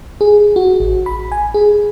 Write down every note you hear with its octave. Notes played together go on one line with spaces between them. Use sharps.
G#4
F#4
A1
B5
G#5
G#4